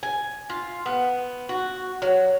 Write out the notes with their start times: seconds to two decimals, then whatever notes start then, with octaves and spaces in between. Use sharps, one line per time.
0.03 G#5
0.50 F4
0.86 B3
1.49 F#4
2.02 F#3